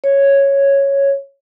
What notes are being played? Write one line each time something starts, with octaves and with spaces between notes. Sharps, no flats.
C#5